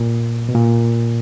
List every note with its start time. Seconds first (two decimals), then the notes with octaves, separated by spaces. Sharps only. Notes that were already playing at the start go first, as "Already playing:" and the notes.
Already playing: A#2
0.49 B2
0.55 A#2